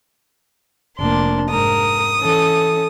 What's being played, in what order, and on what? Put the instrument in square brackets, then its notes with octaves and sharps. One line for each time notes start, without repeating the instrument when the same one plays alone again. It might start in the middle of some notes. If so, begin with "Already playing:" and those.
[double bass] F1 A#3 [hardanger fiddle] D4 C6
[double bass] G#2 [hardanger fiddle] A#4 [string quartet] D#6
[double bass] E3 [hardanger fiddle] C#4 A4